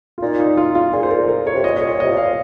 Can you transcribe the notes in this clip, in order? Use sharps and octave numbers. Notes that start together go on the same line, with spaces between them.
F4
A#2 D#4
D#4
F4
F4
A#2 G#4
C5
A#4
A#4
C#5
C3
A#2 D#5
D#5
C#5
A#2
C3 D#5
A#2
F5